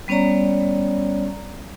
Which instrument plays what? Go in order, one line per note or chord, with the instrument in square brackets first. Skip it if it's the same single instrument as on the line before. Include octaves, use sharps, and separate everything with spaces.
[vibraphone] G3 B3 C#4 C#5 D5 A#5